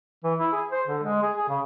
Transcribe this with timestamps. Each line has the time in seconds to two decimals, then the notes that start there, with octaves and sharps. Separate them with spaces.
0.24 E3
0.39 E4
0.52 G#4
0.71 C5
0.87 D3
1.03 G#3
1.22 G#4
1.37 G#4
1.49 C#3